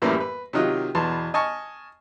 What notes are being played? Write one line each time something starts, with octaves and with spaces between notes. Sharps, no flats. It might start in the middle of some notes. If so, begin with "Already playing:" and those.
F#2 A2 E3 G3 A#3 E4
B4
C3 D#3 F#3 F4 D#5 F#6
E2 B2 A5 C6
D#5 G#5 A5 C#6 F6